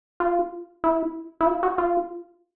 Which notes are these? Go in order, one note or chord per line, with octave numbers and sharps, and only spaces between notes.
F4
E4
E4
F4
F#4
F4